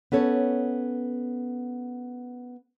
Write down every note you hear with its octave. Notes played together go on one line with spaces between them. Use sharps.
B3 C#4 A4 C#5